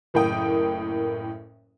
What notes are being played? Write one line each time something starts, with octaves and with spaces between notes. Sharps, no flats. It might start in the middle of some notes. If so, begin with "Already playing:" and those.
F#1 A2 A#3 G5 D#6